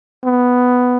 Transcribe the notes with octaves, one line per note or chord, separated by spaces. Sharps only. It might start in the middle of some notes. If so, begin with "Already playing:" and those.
B3